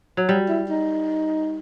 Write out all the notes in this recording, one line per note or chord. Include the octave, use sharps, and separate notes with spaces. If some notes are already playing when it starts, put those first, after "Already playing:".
F#3
G3
E4
D#4